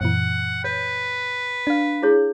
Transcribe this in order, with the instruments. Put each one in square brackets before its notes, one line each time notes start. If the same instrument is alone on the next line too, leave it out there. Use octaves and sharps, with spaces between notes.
[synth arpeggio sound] F#2 A#2 E3 [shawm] F#5
[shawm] B4 [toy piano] C#5
[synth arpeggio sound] D4 F5
[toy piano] E4 G#4 C#5